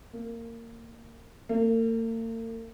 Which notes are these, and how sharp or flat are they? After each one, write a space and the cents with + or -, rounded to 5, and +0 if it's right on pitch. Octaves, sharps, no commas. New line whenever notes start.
A#3 -20
A#3 -45